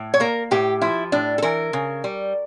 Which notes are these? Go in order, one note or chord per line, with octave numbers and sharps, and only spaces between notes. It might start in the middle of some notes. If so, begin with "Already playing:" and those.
Already playing: A2
C#5
A#3 A#4
A2 G4
F3 E4
A2 D4
A4
E3 A#4
C#3
G3